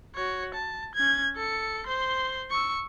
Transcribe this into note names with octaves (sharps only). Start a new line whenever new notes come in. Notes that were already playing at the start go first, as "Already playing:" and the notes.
F#4 C#5
A5
C#4 G#6
A4 C#7
C5 C6
C#6 E6